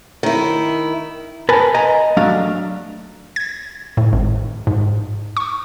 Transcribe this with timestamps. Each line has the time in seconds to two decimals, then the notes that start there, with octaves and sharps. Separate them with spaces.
0.23 D#3 E4
1.49 A#4 B4 G#5 A5
1.74 D#5 G#5 A#5
2.17 F#3 A3 D4 F5
3.36 G#6
3.97 A2
4.13 G#1
4.67 G#2
5.37 C#6